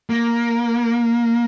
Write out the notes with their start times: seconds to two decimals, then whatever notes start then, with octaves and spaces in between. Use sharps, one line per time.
0.10 A#3